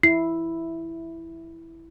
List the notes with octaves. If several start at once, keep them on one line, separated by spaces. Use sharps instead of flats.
E4 C7